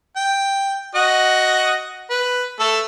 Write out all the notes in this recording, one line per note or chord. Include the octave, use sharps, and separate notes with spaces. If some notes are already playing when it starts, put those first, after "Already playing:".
G5
F#4 D#5 F#5
B4
A3 A4